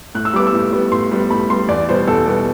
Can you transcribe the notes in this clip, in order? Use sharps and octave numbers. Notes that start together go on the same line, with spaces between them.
A2 F#6
E6
G3 B3 D6
E6
A2
G3 B3
A2 C6
G3 B3
A2 B5
G3 B3 C6
E2 D5
B2 G3 B3 C5
E2 A4
B2 G3 B3